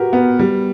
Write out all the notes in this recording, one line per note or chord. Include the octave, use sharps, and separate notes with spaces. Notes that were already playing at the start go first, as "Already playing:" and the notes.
Already playing: F#4 G4 A#4 B4
B3
G3